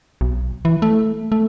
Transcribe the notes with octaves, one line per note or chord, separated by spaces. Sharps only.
B1
E3
A3
A3